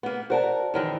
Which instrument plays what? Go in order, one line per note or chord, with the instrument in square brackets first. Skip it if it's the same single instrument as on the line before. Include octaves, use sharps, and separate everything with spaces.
[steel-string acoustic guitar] A#3 B3
[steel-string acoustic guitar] F#4 A#4 [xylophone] C5 D5 A5
[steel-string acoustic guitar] F#2 D#3 E3